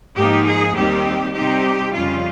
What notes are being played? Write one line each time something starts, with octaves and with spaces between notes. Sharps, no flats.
G#2 F3 A#3 D#4 G4
G#4
D#2 D#3 G3 C4 G4
C3 G3 C4 D#4 G4
F2 C#3 G3 C#4 F4